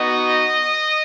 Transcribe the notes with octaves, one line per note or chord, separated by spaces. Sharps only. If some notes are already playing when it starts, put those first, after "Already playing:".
Already playing: B3 D#4 F#4 D#5